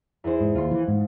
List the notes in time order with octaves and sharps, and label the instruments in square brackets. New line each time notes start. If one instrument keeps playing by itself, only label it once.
[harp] E2 E4 C5
[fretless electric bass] G#2
[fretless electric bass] D#2 [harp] F4 C6
[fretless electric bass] E3
G#2